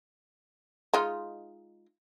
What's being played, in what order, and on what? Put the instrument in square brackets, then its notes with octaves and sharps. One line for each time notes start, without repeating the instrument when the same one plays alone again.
[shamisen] G#3 D#4 F4